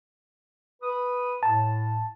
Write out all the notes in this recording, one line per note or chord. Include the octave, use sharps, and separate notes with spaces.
B4 D#6
A2 A5